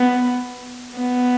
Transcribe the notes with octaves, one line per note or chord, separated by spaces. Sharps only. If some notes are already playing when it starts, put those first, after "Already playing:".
Already playing: B3
B3